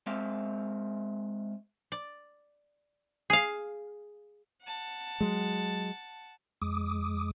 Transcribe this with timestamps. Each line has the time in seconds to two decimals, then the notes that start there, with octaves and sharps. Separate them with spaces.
0.06 G#3 C4 E5 F5
1.92 D5
3.30 G#4 F5
4.63 F#5 A5
5.21 F#3 G#3
6.62 F2 G#3 D6 D#6